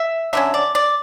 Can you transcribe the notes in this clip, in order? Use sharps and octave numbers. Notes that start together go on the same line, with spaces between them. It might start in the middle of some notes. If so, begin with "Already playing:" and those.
Already playing: E5
D3 F#3 C#4 E5
D5
D5